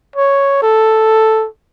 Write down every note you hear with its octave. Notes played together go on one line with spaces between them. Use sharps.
C#5
A4